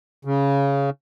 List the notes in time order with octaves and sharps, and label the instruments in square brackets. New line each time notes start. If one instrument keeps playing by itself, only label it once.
[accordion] C#3